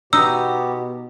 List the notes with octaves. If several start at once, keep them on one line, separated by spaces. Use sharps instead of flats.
B2 B3 D#4 F#4 G4 E6